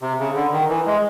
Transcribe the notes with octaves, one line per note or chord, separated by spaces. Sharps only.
C3
C#3
D3
D#3
E3
G#3